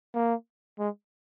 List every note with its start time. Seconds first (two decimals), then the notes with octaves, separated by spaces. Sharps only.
0.15 A#3
0.79 G#3